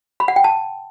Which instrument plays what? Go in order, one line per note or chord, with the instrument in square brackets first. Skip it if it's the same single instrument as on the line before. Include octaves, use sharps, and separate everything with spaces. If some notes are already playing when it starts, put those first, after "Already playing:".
[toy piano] B5
F#5
G5
A5